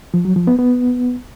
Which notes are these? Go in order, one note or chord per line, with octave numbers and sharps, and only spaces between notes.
F3
F#3
F3
B3
B3